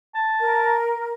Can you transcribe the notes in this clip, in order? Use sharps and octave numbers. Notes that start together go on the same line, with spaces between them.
A5
A#4